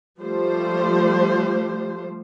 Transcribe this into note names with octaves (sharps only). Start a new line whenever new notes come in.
F3 G3 A3 G4 C5